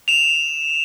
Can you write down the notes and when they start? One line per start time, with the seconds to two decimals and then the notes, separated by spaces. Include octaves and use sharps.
0.08 E7 F7